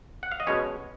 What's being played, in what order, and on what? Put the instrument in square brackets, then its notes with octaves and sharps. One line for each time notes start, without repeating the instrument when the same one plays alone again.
[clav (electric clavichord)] F#5
F5
D#5
B2 G#3 C#4 C#5